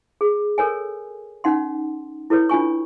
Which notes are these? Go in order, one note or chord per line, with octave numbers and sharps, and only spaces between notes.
G#4
A4 A#4 C#5 G#5
C#4 D#4 F#5 C6
E4 A4 B4 C#5
D4 F4 G#5 C#6